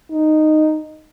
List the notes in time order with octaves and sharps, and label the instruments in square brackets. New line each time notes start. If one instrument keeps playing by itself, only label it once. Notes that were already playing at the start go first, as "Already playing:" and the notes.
[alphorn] D#4